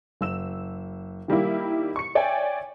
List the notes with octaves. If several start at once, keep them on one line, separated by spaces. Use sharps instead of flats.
F#1 E6 E7
D#3 G3 A#3 E4
C#6 C#7
C#5 D5 E5 G5 G#5